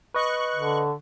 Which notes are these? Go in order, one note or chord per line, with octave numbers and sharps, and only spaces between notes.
B4 D#5 C#6 F#6
D3